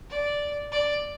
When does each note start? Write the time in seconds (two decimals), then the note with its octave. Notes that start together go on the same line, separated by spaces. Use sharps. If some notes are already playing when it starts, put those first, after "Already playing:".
0.10 D5
0.72 D5